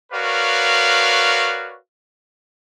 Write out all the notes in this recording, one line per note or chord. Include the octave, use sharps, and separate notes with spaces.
F#4 A#4 B4 C#5 D5 F5